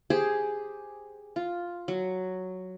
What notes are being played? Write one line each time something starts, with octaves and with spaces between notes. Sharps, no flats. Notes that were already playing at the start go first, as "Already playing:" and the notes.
G4 G#4 C5
F4
F#3